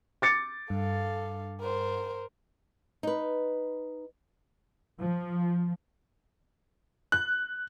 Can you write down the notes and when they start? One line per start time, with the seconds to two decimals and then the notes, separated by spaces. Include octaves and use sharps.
0.22 D6 A6 C#7
0.70 G2 A4 F5
1.60 A#4 C5
3.03 D#4 B4
5.00 F3
7.12 F#6